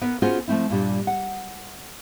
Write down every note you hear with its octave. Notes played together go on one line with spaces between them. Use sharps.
B3 A#4 B4
B3 C#4 F4 F#4 G#4 C5
F3 A3 C4 E4
G2 A#2 G3 D4
F#5